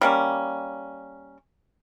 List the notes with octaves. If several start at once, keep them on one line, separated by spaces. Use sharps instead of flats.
G3 A#3 C#4